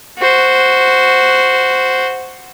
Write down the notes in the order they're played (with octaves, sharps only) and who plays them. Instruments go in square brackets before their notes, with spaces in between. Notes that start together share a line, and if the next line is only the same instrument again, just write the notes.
[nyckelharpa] F#4 C5